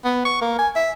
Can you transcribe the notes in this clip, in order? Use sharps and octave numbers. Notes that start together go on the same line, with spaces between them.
B3
C#6
A#3
G#5
E5